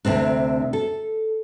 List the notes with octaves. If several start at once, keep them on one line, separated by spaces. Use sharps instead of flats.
D2 C3 C4 D4
A4